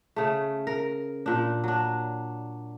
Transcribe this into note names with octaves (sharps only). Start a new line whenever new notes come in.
C#3 A3
A#4
A#2 D4
F#3 D4